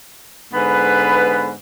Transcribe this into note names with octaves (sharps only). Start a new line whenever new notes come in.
G#2 D3 B3 B4